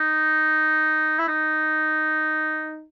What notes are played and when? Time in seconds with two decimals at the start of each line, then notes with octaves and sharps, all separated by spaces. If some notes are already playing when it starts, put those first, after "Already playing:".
Already playing: D#4
1.19 E4
1.28 D#4